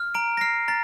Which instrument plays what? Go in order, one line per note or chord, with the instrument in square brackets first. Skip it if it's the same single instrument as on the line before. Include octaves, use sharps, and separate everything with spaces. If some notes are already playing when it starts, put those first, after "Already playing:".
Already playing: [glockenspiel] F6
A#5 D7
A#6
F6 C7
A#5 A6